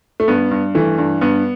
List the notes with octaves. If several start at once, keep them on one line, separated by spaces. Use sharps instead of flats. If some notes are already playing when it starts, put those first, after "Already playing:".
A3
G2 B3
G2
E3 A3
G2
G2 B3